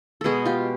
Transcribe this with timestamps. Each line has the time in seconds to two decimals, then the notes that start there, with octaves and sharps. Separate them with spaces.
0.21 B2 G#3 B3 F#4 G#4 A4
0.45 F4 G4